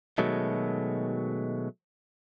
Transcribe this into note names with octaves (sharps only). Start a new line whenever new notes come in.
B2 D#3 F#3 G#3 A3